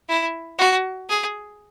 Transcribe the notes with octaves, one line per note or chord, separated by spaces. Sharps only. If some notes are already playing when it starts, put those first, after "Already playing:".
E4
F#4
G#4